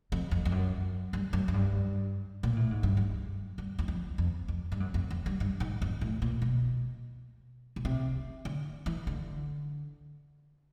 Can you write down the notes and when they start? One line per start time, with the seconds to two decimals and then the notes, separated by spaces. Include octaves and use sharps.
0.12 F2
0.31 F2
0.45 F2
0.52 F#2
1.13 G2
1.33 F#2
1.48 F#2
1.54 G2
2.43 A#2
2.56 A2
2.71 G#2
2.83 G2
2.97 F#2
3.58 G2
3.79 E2
3.88 F2
4.18 F2
4.48 F2
4.72 G2
4.80 F#2
4.94 F2
5.11 F2
5.26 G2
5.40 G2
5.60 G#2
5.82 F2
6.01 A2
6.22 A#2
6.42 B2
7.76 B2
7.85 C3
8.45 D3
8.86 E3
9.07 D3